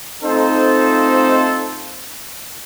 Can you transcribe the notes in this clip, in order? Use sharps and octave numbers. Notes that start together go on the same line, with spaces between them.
A3 C4 D#4 F4 A4 C5